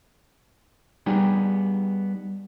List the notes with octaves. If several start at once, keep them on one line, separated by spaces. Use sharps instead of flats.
G3 B3 D#4 G4 G#4